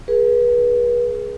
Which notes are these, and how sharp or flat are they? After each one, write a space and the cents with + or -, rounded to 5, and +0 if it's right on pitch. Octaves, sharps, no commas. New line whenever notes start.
G#4 +0 B4 -35